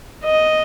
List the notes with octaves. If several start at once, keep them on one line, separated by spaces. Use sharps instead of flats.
D#5